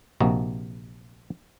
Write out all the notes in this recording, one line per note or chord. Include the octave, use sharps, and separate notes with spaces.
A#1 C3 A#3 F#4 D#5 F#5